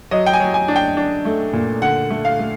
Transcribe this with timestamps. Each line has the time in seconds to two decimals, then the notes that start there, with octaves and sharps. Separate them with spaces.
0.11 F#3 D#5
0.26 G5
0.33 G#5
0.40 F#3
0.54 G#5
0.68 D4
0.76 G5
0.97 D4
1.25 A3
1.53 A#2
1.82 D3 F#5
2.10 A3
2.25 F5
2.39 A3